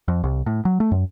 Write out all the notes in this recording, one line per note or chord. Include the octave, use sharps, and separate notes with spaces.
F2
C2
A2
F#3
A3
F#2